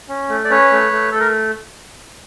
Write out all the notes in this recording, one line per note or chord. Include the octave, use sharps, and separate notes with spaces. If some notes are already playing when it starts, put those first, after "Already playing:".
C#4
A3
D5
C#4 B4 C#5
A3
A3
A3 A4
A#4